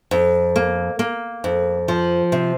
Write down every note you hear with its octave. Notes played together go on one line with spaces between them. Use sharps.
F2
A#3
A#3
F2
F3
C3